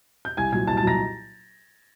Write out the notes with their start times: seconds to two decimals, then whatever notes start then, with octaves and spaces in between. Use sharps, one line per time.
0.25 G6
0.37 C2 G#5 G#6
0.52 A#2 F#3 G#5 G#6
0.67 C2 A5 A6
0.77 A5 A6
0.83 A#2 F#3 A#5 A#6